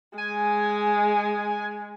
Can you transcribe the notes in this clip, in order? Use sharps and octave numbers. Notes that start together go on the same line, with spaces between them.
G#3 G#5